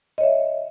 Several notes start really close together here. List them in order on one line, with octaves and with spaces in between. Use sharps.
D#5 C#5 E5